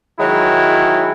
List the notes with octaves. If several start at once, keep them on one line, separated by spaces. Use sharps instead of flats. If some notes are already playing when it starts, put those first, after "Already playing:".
D#3 F#3 G#3 E4